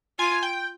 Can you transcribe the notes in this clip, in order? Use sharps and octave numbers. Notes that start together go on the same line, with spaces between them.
F4 G#5
G5